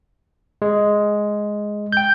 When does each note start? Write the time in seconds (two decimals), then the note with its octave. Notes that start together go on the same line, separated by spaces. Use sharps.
0.62 G#3
1.92 G5 G6